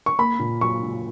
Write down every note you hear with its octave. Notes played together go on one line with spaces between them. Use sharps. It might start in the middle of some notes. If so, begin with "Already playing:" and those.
C#6
A#3 B5
A#2
F#3 C#6
A#2